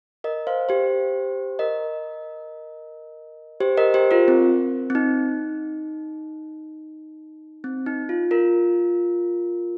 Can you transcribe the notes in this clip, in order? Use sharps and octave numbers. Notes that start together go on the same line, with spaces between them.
A#4 D#5
C5 F5
G4 C5
A#4 D#5
G4 C5
A#4 D#5
G4 C5
F4 A#4
C4
C4
D#4
C4
D#4
F4
F4 A#4